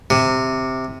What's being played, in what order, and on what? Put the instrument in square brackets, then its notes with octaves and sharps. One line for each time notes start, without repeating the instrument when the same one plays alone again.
[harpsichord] C3